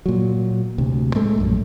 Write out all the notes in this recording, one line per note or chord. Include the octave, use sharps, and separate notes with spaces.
A#2 F#3
D2 C3
A2 G#3 A3
A#1 F#2